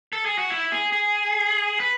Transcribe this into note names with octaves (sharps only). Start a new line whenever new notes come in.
A4
G#4
F#4
E4
G#4
G#4
B4